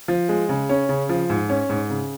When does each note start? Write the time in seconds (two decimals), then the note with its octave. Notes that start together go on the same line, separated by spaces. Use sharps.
0.08 F3
0.29 G#3
0.49 C#3
0.69 C#4
0.89 C#3
1.09 F3
1.30 G#2
1.49 C#4
1.69 G#2
1.90 C#3